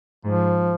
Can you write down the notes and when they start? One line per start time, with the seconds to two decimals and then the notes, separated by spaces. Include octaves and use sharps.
0.25 G#2 F3